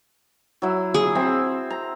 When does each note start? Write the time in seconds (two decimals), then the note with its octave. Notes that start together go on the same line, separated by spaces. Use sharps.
0.62 F#3 E4
0.94 G#4
1.15 C4 E5 B5
1.70 A#5